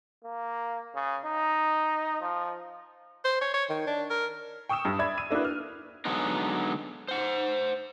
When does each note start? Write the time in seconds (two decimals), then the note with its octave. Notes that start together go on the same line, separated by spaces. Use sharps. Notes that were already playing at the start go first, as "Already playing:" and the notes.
0.24 A#3
0.95 C#3
1.25 D#4
2.21 F3
3.25 C5
3.41 C#5
3.54 C#5
3.70 D#3
3.87 D4
4.10 A#4
4.69 G5 C#6 D#6 E6 E7
4.85 G2
4.99 D5 E5 B5 G#6
5.18 E6 D#7
5.30 A#3 D4 E4 F#4 B4
5.45 F6
6.05 D3 F#3 G#3 B3 D#4
7.08 C5 F#5